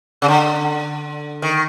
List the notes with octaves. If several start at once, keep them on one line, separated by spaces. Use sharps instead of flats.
C#3
D3
D#3